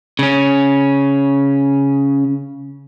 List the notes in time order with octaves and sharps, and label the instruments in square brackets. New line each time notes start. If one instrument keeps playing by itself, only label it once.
[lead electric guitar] C#3 C#4